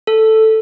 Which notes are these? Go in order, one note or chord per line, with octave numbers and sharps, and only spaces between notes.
A4